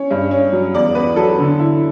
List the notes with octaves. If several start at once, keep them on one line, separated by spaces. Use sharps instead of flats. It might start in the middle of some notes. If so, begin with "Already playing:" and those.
Already playing: C#4
G2
C#4
F#3
E2 D5
B3 B4
F#3 A4
D3
E4